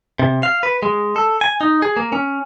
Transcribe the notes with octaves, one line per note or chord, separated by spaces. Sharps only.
C3
F5
B4
G#3
A4
G#5
D#4
G#4
A#3
C#4